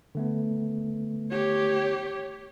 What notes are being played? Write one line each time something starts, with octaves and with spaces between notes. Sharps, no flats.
D3 A3 B3
G4 C#5